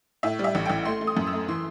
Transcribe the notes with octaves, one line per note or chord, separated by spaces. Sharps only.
A2 E5
G3
E5
A1
A1 G5
A3 C6
A3
D#6
F#2
E6
A3
E3 C6